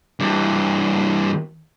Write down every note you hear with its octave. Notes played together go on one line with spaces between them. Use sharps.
G2 E3